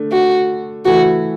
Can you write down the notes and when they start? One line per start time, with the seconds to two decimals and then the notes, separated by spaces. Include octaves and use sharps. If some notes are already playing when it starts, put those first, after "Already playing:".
Already playing: D3 A3 D4
0.12 F#4
0.85 E3 A3 E4 F#4